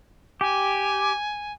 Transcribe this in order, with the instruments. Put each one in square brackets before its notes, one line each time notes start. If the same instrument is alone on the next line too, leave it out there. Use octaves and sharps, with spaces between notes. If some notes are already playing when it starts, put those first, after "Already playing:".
[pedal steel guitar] G4 [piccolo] G#5